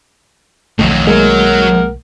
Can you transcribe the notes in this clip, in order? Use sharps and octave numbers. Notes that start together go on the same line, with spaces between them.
B1 F2 D#3 F#3 A3
F#3 G#3 A#3 A#4 F#5